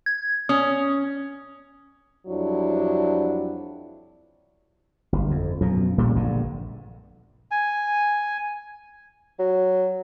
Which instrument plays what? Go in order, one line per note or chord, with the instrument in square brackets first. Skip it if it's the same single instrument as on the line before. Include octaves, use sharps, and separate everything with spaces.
[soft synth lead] G#6
[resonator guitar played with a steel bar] C#4 [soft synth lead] D#6
[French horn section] F2 F#3 G3 D4 E4
[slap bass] G1
F2
F#2 B2 F3
A#1 A#2 G3 G#3
A#1 G2 D3
[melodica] G#5
[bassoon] F#3